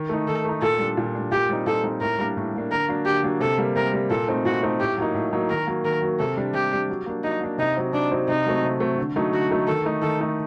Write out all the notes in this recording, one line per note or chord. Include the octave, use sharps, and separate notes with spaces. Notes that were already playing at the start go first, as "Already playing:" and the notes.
Already playing: D#3
A3 D#4
D#3 A4
A3 D#4
A#2 A4
G3 D4
A#2
G3 D4
A#2 G4
G3 C4 D#4
A#2 A4
G3 C4 D#4
A2 A#4
G3 A#3 D4
A2
G3 A#3 D4
D3 A#4
F#3 A#3 D4
D3 G4
F#3 A#3 D4
C3 A4
G3 A#3
C3 A#4
G3 A#3
A#2 A4
A3 C4 D#4
A#2 F#4
A3 C4 D#4
A2 G4
F#3 A#3 D#4
A2
F#3 A#3 D#4
D#3 A#4
F#3 A#3
D#3 A#4
F#3 A#3
C3 A4
G3 D4
C3 G4
G3 D4
F#3
A#3 D4
F#3 D#4
A#3 D4
C3 D#4
F#3 C4 D#4
C3 D4
F#3 C4 D#4
C3 D#4
F#3 A3 C4
C3
F#3 A3 C4
D3
F#3 A3 D#4
D3 F#4
F#3 A3 D#4
D#3 A4
A3 D#4
D#3 A4
A3 D#4